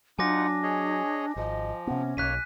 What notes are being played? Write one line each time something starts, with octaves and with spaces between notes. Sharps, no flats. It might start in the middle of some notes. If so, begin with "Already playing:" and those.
F#3 D4 D#4 F4 F#5 G#5 D6 A#6
G#4 C#5 D#5
G#1 F3 D#5
C3 B3 C#4
E1 B1 A#3 C#5 F#6 B6 D#7